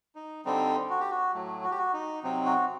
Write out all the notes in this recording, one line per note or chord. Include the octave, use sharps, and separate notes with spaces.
D#4
D3 G3 C4 D#4
F#4
G4
F#4
A2 F#3 A3
F#4
G4
F#4
D#4
C3 F#3 C4 D#4
F#4